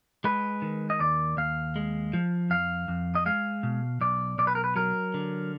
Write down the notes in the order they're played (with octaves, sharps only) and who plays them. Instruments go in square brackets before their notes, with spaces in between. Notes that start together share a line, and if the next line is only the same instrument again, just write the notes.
[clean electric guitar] G#3 B4
D#3
D#5
D#2 D5
D#2 F5
G#3
F3
F2 F5
F2
D#5
G#3 F5
B2
B1 D5
B1 D5
B4
A#4
B4
F#3 A#4
D3